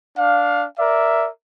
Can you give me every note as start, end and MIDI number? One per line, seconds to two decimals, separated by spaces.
0.18 0.65 62
0.18 0.65 77
0.79 1.29 70
0.79 1.29 74
0.79 1.29 76